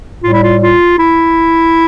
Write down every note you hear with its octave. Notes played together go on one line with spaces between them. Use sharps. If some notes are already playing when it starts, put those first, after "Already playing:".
A2 G3 F4
E4
F4
F4
E4